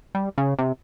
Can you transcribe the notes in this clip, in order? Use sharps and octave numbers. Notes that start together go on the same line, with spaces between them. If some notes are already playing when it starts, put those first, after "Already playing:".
G3
C#3
C3